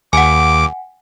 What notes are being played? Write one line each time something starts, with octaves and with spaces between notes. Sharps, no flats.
D#2 F#5 G#5 D6